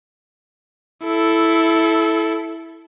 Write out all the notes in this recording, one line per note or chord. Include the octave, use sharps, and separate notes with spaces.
E4 A4